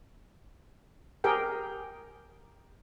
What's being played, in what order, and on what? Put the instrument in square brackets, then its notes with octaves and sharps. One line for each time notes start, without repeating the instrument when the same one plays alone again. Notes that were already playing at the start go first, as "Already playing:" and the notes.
[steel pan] G4 G#4 A#4 G5